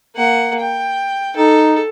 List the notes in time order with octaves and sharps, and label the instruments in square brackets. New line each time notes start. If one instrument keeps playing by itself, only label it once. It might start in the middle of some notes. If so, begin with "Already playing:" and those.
[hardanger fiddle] A#3 F#5
G5
[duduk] D#4 [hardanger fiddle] A4